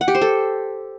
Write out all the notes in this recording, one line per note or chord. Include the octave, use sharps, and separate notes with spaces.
F#5
G4
C5
A4